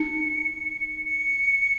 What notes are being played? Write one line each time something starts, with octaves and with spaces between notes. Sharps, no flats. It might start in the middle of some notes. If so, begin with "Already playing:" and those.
Already playing: D#4 C#7
C#7